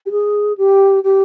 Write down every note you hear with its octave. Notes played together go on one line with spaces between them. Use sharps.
G4
G#4
G4
G4